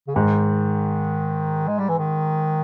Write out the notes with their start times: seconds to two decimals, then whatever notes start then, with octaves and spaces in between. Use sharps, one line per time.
0.08 C#3
0.15 G#2 D#3
1.68 G#3
1.78 G3
1.89 E3
1.99 D#3